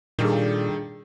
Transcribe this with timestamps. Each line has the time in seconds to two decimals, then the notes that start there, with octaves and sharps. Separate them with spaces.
0.19 A#2 D#3 G3 D4 G#4 A4